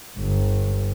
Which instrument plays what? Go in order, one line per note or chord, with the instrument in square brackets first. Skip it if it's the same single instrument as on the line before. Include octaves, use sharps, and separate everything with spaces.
[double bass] G1